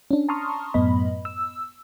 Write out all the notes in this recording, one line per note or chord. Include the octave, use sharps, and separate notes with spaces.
C#4 D4
A5 A#5 C6 C#6 D#6 F6
F#2 A2 B3 D#5 B5
E6